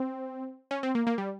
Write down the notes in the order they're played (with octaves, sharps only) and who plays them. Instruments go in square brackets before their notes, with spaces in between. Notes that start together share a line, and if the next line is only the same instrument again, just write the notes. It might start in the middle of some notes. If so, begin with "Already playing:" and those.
Already playing: [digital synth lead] C4
C#4
C4
A#3
A#3
G3